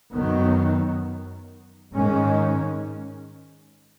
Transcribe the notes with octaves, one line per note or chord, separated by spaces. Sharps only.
F#2 D#3 F#3 B3
G#2 D#3 G#3 C#4